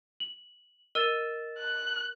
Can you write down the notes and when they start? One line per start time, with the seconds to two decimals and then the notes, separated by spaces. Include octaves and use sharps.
0.20 F#7
0.95 A#4 D#5 E6 A6 D#7 E7
1.59 F#6